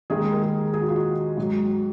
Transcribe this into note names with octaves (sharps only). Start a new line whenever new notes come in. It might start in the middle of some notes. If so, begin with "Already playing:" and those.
D#2 D#3 G#3 G#4
A#4
G#4
G#4
F#4
F4
F#4
G#2 F#3